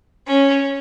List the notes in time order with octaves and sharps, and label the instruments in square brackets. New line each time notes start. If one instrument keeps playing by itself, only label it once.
[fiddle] C#4